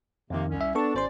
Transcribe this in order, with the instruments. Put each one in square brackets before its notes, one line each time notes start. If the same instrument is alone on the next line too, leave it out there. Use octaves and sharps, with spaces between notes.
[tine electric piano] F2 D#3 [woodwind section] C3 A#3
[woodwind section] C2 C#4
[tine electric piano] E5
[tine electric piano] B3 A4 C#6 [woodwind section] D4
[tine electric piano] G#1 C5 C6 [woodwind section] C#4 D5